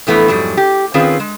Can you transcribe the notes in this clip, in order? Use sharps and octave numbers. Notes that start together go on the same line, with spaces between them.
F2 E3 A3 B3 E4
F2 G#2 F#3 G3
G4
D#3 C4 C#4 F4 G#4 B4
G#3